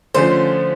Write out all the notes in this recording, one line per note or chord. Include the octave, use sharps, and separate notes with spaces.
D3 F3 A3 C#4 C5